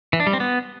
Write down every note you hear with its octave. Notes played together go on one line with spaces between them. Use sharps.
E3
D4
G3
C4
B3